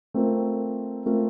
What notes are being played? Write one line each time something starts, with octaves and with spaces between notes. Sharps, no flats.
A3 C4 F4 A#4
A3 C4 F4 A#4